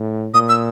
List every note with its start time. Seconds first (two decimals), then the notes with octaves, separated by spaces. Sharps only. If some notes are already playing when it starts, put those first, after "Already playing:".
Already playing: A2
0.34 A#2 D#6
0.49 E6